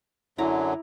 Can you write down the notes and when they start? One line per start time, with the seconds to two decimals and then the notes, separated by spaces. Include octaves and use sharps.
0.38 F#2 D3 F#3 E4 A#5 D6